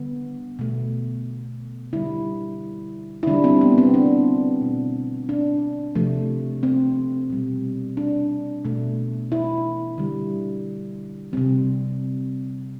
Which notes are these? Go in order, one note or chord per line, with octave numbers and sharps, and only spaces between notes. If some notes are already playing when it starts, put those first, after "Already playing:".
Already playing: D3 G3 B3
B2 A3
D3 G3 E4
E4
D3 G3 D4
C4
B3
C4
D4
B2 A3
D4
C3 F3 A3
C4
B2 G3
D4
B2 A3
E4
D3 G3
C3 G3 C4